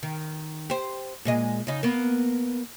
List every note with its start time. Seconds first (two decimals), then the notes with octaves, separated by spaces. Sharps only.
0.03 D#3
0.70 G4 C5
1.25 A#2 G#3 D#5
1.67 C#3 D#4
1.83 A#3 B3